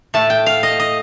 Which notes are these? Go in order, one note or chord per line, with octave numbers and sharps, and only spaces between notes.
A2 A3 A5
G5
F5
D#5
D#5